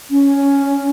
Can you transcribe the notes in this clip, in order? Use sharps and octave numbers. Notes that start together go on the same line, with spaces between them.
C#4